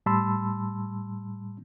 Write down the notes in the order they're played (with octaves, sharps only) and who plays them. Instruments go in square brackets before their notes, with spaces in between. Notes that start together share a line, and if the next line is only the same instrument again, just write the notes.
[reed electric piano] A2 G3 A5 B5 C6 E6